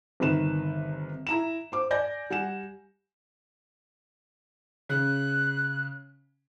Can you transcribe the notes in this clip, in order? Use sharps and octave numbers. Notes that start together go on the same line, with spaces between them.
G1 C3 D#3 B4 E7
E4 A#5 E7
C5 D6
D5 G#5 G6 A#6
G3 F#5 G#5 E7
C#3 F#6